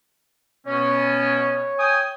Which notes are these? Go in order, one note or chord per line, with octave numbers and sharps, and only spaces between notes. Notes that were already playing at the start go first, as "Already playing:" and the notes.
B2 C#4 C#5
G5 G#5 D#6